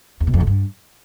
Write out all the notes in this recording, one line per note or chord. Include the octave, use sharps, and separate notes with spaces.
E2
B2
F2
B2
G2